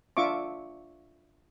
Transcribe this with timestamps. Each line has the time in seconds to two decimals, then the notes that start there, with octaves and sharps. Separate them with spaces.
0.17 D4 F4 E5 C#6 D6